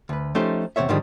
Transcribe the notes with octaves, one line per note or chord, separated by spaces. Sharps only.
D2 B4
F3 A3 C#4 D#4 G4 C5
E2 C3 C#4 C5 C#5 E5
G#2 D3 D#3 F3 G3 G#3